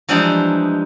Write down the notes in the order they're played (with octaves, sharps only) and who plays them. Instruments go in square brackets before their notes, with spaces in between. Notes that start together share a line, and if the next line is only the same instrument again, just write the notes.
[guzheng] E3 F3 G3 G#3 D4 D#4